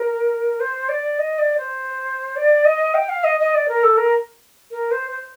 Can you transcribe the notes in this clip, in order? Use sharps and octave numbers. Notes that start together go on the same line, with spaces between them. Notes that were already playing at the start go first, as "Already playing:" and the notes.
Already playing: A#4
C5
D5
D#5
D5
C5
D5
D#5
G5
F5
D#5
D#5
D5
A#4
A4
A#4
A#4
C5
C5